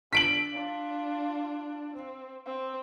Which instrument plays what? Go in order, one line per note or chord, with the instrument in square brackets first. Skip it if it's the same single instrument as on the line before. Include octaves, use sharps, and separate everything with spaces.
[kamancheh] D4 A4 [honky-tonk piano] B6 D7 F#7
[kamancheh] D4 F4
C4
C4